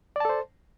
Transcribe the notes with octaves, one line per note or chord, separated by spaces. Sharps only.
A4 C5 D5 A5